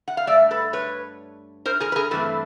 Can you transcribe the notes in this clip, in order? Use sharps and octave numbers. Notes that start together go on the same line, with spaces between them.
F#5
F5
G2 E3 A3 D5 E5
A4 B4
B4 C#5
A#4 C5
G#4 A#4
B4
G#4 A#4
G2 E3 A3 C4 A4 B4